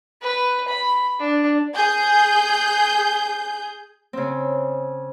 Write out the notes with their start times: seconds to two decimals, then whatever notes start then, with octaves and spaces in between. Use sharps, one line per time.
0.22 B4
0.68 B5
1.20 D4
1.74 G#4 G6
4.13 C#3 C4